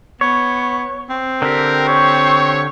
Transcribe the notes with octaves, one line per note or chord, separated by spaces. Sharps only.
B3 C#5
C4
D3 G4 A#4
C#5 C#6